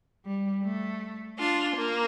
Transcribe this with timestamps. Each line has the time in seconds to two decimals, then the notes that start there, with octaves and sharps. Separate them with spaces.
0.24 G3
0.63 A3
1.39 D4 F4
1.76 A#3